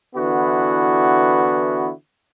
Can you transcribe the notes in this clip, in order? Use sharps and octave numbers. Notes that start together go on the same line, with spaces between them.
D3 E3 B3 E4 F#4